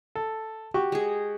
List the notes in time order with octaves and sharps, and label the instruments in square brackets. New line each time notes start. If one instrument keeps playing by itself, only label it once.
[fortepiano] A4
F#4 G4 C#6
[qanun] G#3 G#4